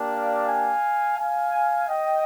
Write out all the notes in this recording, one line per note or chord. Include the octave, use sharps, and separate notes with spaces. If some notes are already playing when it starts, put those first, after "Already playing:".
Already playing: A#3 D4 G4
D5 F5
F5 G#5
F5 G#5
D#5 G5